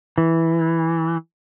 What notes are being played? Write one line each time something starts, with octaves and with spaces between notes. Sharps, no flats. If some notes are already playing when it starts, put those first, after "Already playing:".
E3